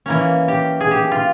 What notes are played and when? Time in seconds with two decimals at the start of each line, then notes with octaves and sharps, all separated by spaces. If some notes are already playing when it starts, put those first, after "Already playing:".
0.06 E3 A#3 C#4
0.48 G4
0.80 G#4
0.91 G4
1.11 F4